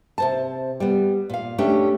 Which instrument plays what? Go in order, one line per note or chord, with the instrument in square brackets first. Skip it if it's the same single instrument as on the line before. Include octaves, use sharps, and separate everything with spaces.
[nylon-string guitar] C3 C5 A5
G3 B3
A#2 F5
A3 C#4 D4 G4